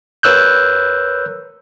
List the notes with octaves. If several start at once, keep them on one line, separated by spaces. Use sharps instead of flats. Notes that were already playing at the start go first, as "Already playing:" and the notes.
A#4 B4 C#5 E6 F#6 G6